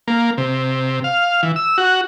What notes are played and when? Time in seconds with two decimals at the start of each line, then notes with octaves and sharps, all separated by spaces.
0.08 A#3
0.38 C3
1.04 F5
1.43 E3
1.56 E6
1.78 F#4